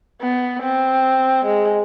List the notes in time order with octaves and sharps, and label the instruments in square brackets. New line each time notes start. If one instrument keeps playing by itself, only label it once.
[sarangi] B3
C4
G#3